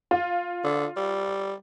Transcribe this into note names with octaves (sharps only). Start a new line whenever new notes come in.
F4
D3
G3